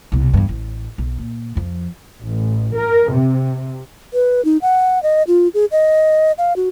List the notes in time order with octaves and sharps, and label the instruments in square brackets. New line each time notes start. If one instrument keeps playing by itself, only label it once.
[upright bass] C2 B2
E2 G2
A1
B1
A#2
F2 F3
[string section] A1
A#4
C3
[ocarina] B4
D#4
F#5
D#5
F4
G#4
D#5
F5
F#4